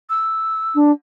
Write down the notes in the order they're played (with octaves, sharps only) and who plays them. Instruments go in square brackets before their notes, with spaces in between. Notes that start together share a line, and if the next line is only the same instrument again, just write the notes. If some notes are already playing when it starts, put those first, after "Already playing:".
[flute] E6
[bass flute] D4